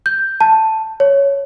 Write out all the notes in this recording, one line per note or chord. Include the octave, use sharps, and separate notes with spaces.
G6
A5
C#5